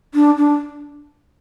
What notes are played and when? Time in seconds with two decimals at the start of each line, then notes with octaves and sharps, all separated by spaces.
0.14 D4
0.37 D4